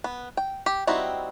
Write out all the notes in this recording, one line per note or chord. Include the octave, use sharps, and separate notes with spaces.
B3
G5
G4
G3 C4 D#4 E4 F#4